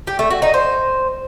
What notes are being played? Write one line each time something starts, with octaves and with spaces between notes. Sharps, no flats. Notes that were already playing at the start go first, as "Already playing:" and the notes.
G4
A3
F#4
D#4
C5